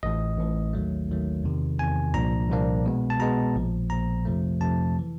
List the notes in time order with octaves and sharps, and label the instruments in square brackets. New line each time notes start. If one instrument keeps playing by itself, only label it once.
[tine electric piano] A1 A2 E3 D#5
A1 A2 E3
D#2 D#3 F#3 A3
D#2 D#3 F#3 A3
E2 C3 D#3
E2 C3 D#3 G#5
C2 A#2 F3 A#3 D4 A#5
C2 A#2 F3 A#3 D4
B2 G#3 B3
A5
B2 G#3 B3 A#5
A#1 A#2 F3
A#1 A#2 F3 A#5
F2 C3 F3 A3
F2 C3 F3 A3 A5
E3